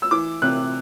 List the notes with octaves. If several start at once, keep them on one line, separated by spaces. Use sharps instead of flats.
E6
E3 D6
C3 F#6